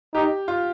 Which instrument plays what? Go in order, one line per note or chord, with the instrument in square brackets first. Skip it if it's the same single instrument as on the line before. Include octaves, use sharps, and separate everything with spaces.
[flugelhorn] D#4 [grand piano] G4
[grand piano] F4